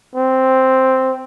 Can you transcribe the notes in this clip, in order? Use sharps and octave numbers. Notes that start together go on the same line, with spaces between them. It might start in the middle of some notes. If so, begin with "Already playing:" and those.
C4